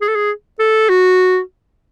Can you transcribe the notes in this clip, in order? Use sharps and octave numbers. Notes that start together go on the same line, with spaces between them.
G#4
A4
G#4
A4
F#4